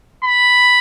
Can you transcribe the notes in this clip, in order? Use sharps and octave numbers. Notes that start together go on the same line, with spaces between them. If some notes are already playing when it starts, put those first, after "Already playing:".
B5